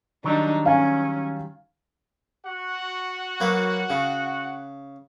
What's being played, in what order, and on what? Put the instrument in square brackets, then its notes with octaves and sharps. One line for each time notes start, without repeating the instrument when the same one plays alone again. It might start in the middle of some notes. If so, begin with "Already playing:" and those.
[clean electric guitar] D#3 F#3 G3 [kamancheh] D4 D#4
[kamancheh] C#4 [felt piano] F5 G#5
[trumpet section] F#4 F#5
[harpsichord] F#3 A#3 B4
C#3